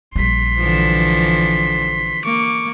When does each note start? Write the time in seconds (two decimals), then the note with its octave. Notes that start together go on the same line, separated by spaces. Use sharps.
0.16 A#1 G3 C6 B6
0.57 D3 E3 F3
2.25 A#3 C#6 D6